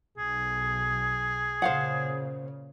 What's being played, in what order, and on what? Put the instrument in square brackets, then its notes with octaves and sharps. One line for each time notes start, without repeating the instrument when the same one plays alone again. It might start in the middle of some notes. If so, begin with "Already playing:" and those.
[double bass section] B1 [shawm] G#4
[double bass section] A#2 C#3 [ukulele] C5 F5 F#5